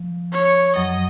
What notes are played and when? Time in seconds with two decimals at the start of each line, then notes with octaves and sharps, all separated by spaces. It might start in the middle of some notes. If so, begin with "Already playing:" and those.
Already playing: F3
0.32 C#5
0.76 F#2 F#3 D#5